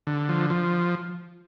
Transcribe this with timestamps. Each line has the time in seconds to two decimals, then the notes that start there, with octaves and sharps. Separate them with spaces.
0.07 D3
0.29 F3
0.50 F3